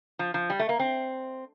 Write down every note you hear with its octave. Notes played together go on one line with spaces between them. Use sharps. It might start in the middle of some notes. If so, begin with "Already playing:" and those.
F3
F3
G3
A3
A#3
C4